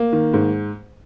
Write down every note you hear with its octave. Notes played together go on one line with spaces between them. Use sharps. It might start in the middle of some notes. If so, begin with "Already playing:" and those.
Already playing: A#3
D#3
G#2